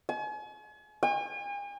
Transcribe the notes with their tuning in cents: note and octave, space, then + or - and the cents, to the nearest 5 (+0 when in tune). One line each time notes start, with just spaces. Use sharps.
G#5 +40
G#5 -45